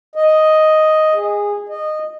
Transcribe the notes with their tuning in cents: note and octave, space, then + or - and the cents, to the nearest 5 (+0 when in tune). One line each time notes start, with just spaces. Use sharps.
D#5 +5
G#4 -20
D#5 -15